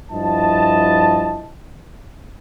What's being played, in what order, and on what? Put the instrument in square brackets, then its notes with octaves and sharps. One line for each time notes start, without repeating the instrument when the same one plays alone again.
[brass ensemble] G2 F3 E4 D#5 A5